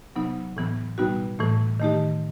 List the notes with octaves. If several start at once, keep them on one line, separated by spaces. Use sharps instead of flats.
C3 F#3 B3 D#4
A2 E3 B3
B2 G3 B3 D#4 F#4
A2 E3 A3
D#3 A3 D#4 G4